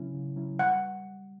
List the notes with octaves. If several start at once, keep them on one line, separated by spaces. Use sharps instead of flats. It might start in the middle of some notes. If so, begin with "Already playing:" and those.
Already playing: C#3 F#3 C#4 E4
C#3
F#3 C#4 E4
G3 F#5